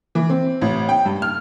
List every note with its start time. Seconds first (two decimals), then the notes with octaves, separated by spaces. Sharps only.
0.15 E3
0.30 C4
0.61 A1
0.89 G5
1.05 G2
1.22 F6